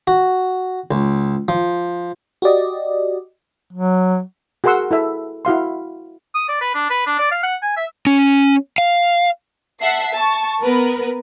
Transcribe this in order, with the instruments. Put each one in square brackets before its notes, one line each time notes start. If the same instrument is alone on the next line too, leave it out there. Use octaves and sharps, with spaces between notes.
[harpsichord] F#4
C#2
F3
[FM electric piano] F#4 G4 D5 D#5
[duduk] F#3
[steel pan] F#4 G#4 A#4 F#5 C6 E6
E4 A4 E5
E4 F#4 F5 C6
[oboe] D#6
D5
B4
D4
B4
D4
D5
F5
F#5
G#5
E5
[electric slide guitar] C#4
F5
[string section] E5 F#5 A5 C7
A5 C#6
B3 A#4 B4